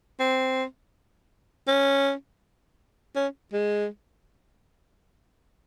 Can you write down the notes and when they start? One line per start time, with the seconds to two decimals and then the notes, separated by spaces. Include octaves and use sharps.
0.19 C4
1.67 C#4
3.16 C#4
3.53 G#3